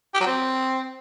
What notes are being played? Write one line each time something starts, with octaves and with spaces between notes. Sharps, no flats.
G4
F#3
C4